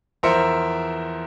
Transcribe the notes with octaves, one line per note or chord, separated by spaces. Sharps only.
E2 F3 A#4 C5 E5 C#7